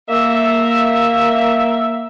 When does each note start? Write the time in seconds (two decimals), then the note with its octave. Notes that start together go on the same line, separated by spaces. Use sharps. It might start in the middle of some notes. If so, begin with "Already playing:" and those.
0.09 A#3 E5